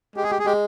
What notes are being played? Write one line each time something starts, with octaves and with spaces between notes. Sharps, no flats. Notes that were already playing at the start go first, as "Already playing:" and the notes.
G#3 G4
G#4
G4
G#4
G#3 G4